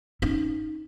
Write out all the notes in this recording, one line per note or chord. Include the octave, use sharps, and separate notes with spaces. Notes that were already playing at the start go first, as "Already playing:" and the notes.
C#4 D#4